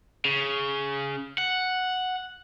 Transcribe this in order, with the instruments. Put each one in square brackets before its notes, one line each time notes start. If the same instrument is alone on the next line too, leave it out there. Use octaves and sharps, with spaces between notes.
[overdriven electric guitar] C#3
F#5